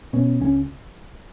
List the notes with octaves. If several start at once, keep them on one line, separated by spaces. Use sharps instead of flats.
B2 C#4
C#2 C#4